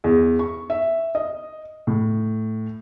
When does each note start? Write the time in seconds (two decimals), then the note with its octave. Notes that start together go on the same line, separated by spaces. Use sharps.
0.04 E2
0.39 C#6
0.70 E5
1.15 D#5
1.87 A2